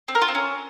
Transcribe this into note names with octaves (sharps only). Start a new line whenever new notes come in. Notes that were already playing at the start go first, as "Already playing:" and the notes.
C4
A#4
F4
C4
C#4